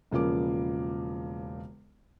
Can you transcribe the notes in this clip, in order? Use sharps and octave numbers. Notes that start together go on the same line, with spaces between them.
E1 C#3 F3 A#3 D6